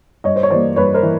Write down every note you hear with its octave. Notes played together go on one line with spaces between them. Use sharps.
G2 C#5 D#5
C5
C#5
E3 G3 A#3 C5 D5
G2 B4 C#5
A#4 C5
E3